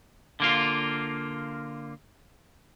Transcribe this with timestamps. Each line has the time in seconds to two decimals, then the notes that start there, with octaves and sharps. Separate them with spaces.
0.40 D3 A#3 F4